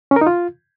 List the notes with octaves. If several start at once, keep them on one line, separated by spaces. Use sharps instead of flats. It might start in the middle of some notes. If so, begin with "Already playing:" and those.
C#4
A#4
D#4
F4